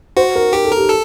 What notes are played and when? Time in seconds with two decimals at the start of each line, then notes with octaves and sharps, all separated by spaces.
0.17 F#4 C5
0.36 A#4
0.53 G4 A#4
0.65 A4
0.72 A#4
0.77 G4
0.89 A4